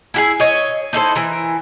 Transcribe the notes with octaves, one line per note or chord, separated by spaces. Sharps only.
E4 G4 G#4
C#5 D#5
D#4 E4 A4 C5
E3 A#4